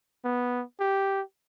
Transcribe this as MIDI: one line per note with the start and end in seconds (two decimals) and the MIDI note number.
0.25 0.63 59
0.80 1.22 67